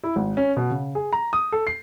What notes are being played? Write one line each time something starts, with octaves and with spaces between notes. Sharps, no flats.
E4
G#1
C#4
B2
C#3
G#4
A#5
D#6
A4
C7